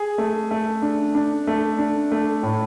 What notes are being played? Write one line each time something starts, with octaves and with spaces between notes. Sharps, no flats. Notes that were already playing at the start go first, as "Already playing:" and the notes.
Already playing: G#4
A3
A3
D4
D4
A3
D4
A3
A2